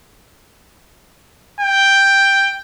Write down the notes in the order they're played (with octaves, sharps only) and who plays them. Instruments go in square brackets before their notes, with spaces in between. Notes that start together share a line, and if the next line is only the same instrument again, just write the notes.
[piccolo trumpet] G5